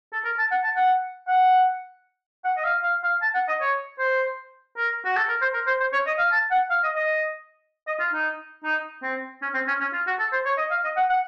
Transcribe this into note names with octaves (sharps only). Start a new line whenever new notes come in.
A4
A#4
A5
F#5
A5
F#5
F#5
F#5
D#5
F5
F5
F5
A5
F#5
D#5
C#5
C5
A#4
F#4
A4
A#4
C5
A#4
C5
C5
C#5
D#5
F5
A5
F#5
F5
D#5
D#5
D#5
F4
D#4
D#4
C4
C#4
C4
C#4
C#4
F4
F#4
A4
C5
C#5
D#5
F5
D#5
F#5
F#5